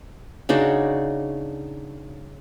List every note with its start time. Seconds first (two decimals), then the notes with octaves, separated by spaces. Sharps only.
0.49 C#3 D4 D#4 F#4